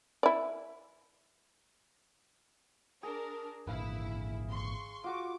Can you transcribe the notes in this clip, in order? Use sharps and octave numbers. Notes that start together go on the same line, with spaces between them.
E4 D5
D4 G#4 A#4
G#1 A#2 D3 E4 B4 F5
C6 C#6
F4 F#4 C#6 D6